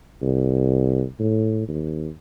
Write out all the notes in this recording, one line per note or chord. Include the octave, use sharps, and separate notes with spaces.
C2
A2
D#2